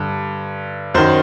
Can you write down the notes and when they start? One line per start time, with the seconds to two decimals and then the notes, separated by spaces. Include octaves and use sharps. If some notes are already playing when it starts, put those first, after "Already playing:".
Already playing: G2 D3
0.94 F#2 D#3 C5